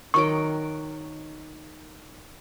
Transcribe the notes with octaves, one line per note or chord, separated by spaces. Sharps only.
D#3 F#3 G5 C#6